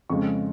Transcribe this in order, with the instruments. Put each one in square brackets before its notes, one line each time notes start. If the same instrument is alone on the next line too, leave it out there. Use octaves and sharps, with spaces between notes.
[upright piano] F2 C#3 G#3 C#6